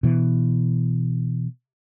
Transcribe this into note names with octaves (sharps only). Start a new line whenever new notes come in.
B2 E3